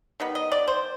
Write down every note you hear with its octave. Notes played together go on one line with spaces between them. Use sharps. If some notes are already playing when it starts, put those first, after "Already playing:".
D#3 G3 B3
D#5
D5
C5